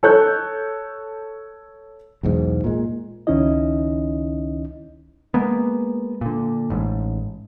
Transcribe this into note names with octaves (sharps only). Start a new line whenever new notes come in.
A4 C#5 F#6 G6
B1 E2 G#2
A#2 G#3
C#2 D#3 C#4 D#4 E4 D#5
G#3 A#3 B3
A#2 D3
A1 G#2